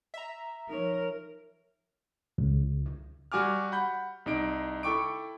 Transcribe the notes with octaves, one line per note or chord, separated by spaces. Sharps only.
E5 A#5
F3 D#4 A#4 C#5
C#2
G3 F#4 G#5 D6 F6
F#5 B5 G6
C2 D#4 D7
E4 A4 G5 C#6 D6 D7